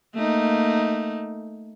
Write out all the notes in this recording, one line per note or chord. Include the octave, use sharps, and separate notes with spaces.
A3 A#3 D#4